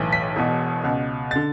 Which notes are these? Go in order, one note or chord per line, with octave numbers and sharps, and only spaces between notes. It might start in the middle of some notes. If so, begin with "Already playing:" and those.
Already playing: B1 A2 E3
B6
E1 E2 B2
C#2 B2
D3 A6